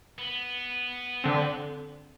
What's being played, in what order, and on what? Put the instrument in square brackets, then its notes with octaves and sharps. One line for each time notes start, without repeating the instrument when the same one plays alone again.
[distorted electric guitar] B3
[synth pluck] D3 C4